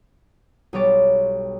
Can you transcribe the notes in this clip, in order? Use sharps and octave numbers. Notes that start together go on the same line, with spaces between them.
B1 G3 B3 C#5 D6 A6